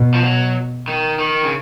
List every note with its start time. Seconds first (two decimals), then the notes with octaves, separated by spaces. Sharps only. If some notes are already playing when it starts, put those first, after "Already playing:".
Already playing: B2
0.14 F3
0.24 F#3
0.88 D#3
1.19 D#3
1.43 C#3